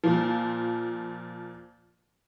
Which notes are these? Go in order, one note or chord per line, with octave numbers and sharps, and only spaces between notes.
A#2 F3